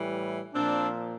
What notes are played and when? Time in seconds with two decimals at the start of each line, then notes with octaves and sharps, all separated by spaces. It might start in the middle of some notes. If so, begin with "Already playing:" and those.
Already playing: A2 E3 G3
0.54 A#2 F3 C4 D4